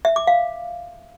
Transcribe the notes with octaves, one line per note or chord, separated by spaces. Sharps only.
E5
D6
F5